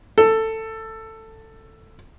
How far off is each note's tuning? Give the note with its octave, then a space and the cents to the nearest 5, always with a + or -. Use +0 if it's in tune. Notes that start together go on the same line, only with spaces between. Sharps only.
A4 +15